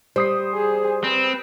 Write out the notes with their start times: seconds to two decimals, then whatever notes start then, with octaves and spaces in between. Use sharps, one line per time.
0.16 G3 C5 D#6 C7
0.54 G#4
1.04 C4 B4